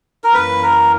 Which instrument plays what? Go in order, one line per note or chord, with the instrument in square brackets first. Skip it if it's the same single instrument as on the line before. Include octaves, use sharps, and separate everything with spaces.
[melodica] A#4
[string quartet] F#2 E3 A#3 C#4 [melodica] B4
[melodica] A#4